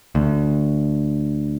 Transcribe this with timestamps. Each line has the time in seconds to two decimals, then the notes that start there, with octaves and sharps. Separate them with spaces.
0.15 D2